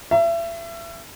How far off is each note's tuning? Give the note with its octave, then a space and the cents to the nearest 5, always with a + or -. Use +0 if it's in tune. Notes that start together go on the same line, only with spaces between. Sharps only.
E5 +30